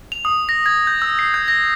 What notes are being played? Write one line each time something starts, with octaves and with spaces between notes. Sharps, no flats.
F7
D#6
A#6
G#6
G6
E6
C7
G6
A#6